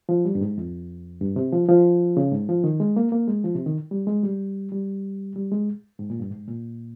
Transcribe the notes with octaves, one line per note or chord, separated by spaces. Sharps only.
F3
G3
G2
G#2
F2
G2
C3
F3
F3
C#3
G#2
F3
D#3
G#3
A#3
A#3
G#3
F3
C3
D#3
G3
G#3
G3
G3
G3
G#3
G#2
A#2
G2
G#2
A#2